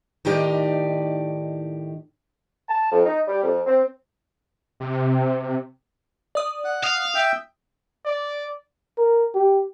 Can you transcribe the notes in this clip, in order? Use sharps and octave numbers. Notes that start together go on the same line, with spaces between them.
A2 D#3 D#4 G4 D5
A5
F2
D#4
G3
F2
C4
C3
D5 D#6
F#5
F5 D#6
E5 G5
D5
A#4
G4